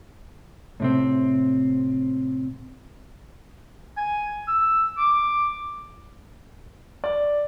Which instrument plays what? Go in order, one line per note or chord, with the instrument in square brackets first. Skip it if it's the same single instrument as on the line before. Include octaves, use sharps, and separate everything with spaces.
[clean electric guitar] A2 C3 C4
[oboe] G#5
E6
D6
[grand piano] D5